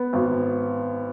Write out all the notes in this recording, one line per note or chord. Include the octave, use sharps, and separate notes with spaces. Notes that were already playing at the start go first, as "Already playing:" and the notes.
Already playing: B3
G#1